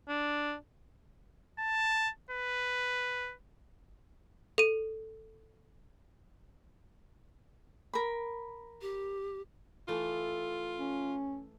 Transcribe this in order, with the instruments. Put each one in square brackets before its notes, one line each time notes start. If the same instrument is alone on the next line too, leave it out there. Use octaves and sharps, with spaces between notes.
[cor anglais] D4
[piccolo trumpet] A5
B4
[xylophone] A4 D#7
[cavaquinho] A#4 B5
[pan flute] G4
[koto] E3 A3 [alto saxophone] F4
[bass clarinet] C#4